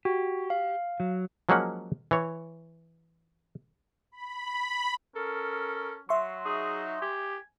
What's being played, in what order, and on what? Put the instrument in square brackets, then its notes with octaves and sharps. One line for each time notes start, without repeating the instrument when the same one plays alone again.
[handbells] F#4 [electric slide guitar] G4
[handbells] F5
[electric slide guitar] F#3
[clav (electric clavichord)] F3 F#3 G#3 A#3 C#4 F#5
E3 C#5
[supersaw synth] B5
[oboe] C#4 [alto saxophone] A4 [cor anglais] A#4
[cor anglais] F#3 [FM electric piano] E5 C6 C#6
[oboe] D#4 [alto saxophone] G#4
[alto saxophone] G4 [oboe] G#5